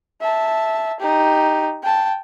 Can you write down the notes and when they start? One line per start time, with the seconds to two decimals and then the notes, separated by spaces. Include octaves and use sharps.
0.21 E5 A5
0.99 D#4 G4
1.82 G5 A5